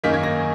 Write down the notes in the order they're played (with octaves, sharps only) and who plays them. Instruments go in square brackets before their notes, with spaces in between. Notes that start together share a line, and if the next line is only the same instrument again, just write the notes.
[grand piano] F#2 D#3 A#3 D#4 B6
G#6
A#6